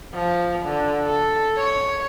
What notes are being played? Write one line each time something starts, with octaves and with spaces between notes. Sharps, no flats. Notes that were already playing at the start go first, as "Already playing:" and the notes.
F3
D3
A4
C#5